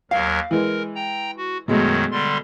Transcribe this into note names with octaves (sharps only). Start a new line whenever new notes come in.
D#2 F#3 A#4 F5
E3 G#3 A#4
G5 A#5
F#4
F#2 B2 D#3 F#3 G#3 A3
D3 G3 C6